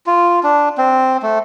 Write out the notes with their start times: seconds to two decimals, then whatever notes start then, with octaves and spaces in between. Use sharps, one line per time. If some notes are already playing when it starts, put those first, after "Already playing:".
0.07 F4
0.43 D4
0.78 C4
1.22 A3